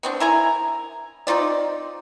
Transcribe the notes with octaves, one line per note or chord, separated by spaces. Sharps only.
B3 C4 D4
E4 A#4 G#5 A#5
C4 D#4 F4 D5